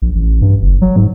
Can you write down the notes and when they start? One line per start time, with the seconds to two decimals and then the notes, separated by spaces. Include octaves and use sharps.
0.02 A#1
0.15 A1
0.42 G2
0.62 F#1
0.81 F#3
0.96 G#2